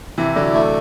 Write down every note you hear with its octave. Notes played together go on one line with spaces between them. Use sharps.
C3 E3 E4
D3 F#3 D5
A3